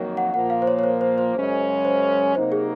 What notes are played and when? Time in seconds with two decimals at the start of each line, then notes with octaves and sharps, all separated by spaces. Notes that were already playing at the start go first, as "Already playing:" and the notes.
Already playing: F2 D#3 F#3 A#3
0.17 F#5
0.34 A#2 F3 A#3 F#5
0.50 F5
0.62 C5
0.67 C#5
0.79 C#5
0.84 C5
1.01 C5
1.18 C5
1.34 F#2 C#3 G#3 C#4
1.85 C5
2.35 C3 F#3 A#3 D#4 C5
2.52 G#4